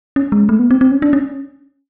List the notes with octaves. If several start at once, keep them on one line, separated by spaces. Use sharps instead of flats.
C#4
G#3
A3
B3
C4
C4
C#4
D4
C#4